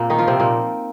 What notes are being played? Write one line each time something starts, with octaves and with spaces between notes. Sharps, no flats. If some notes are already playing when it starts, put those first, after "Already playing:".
Already playing: A#2 A#3 C4 G#4
D#3 D#4
F3 F4
C3 C4
A#2 A#3